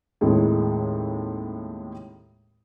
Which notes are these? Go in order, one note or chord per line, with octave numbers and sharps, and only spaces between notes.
D#2 A2 G#3 C4